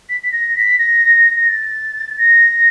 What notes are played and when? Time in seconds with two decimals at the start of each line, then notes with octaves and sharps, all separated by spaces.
0.09 B6
0.23 B6
0.32 A#6
0.55 B6
0.78 A#6
1.36 A#6
1.48 A6
2.18 A#6